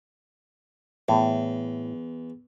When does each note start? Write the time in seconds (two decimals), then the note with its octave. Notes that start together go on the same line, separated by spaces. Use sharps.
1.09 E2 A2